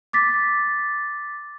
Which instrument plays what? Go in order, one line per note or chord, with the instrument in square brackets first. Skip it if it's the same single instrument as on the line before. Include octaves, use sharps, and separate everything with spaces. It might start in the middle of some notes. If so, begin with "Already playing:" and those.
[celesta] D6 A6 B6